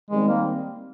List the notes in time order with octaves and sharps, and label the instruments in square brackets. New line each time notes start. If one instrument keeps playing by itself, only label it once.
[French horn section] D#3 G3 C4 [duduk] G#3
[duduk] A#3